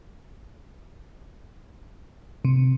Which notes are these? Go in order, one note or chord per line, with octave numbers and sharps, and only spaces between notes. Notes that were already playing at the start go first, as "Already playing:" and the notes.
C3